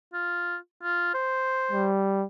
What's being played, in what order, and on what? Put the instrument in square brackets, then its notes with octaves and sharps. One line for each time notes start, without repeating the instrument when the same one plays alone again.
[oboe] F4
F4
C5
[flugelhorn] G3